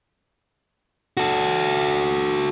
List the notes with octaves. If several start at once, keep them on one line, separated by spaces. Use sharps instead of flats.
F#4 A4